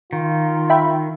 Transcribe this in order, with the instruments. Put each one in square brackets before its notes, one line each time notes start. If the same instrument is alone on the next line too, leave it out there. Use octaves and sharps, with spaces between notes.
[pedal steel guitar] D#3 [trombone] F4
[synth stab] E5 G5 B5